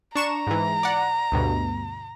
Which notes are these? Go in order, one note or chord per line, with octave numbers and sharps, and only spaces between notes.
D4 A#5 C#6 E7
G#2 E3
D5 F#5
D2 G2 B2